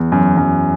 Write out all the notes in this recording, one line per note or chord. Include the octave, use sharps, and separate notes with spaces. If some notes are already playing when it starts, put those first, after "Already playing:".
Already playing: E2
F#2
F#2